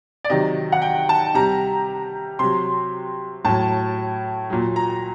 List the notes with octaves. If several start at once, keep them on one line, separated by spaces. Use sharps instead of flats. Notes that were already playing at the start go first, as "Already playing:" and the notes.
D5
C3 D#3 F#3 D#5
F#5
G5
A5
C3 G3 A#5
C3 F#3 C6
A2 F#3 A5
A#2 F#3
A#5